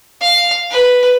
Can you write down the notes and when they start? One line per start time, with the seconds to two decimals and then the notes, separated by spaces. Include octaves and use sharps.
0.21 F5
0.71 B4